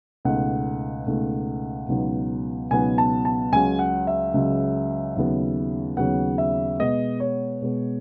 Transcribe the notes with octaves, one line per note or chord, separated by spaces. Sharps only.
C#2 B2 A3 D#4 F#5
C#2 B2 A3 D#4
C#2 B2 F#3 B3 D#4
C#2 B2 F#3 B3 D#4 G#5
A5
A5
C#2 C#3 F#3 G#5
F#5
E5
C#2 C#3 F#3
D#2 C#3 F#3 B3
D#2 C#3 F#3 B3 F#5
E5
B2 G#3 B3 D#5
C#5
B2 G#3 B3